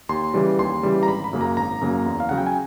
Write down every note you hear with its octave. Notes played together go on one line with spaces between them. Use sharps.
D#2 C6
C#3 E3 G3
D#2 C6
C#3 E3 G3
A#5
G#1 B5
B5
F#2 C#3 F#3 A#3
A#5
G#1 A#5
F#2 C#3 F#3 A#3
E2
F5
C#3 F#3 F#5
G5
G#5